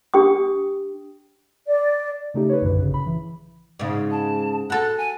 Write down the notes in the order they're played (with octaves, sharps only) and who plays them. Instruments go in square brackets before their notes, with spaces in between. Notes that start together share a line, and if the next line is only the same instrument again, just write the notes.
[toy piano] D4 G4 G5 D#6
[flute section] D5
[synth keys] C#3 A3 D#4 G4
B4 C#5
A#1 F#2 D3 B4
A1 C#3
B5
E3
[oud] G#2 C#3
[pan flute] A5
[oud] F#4 A4 [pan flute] F#6
[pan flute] G#5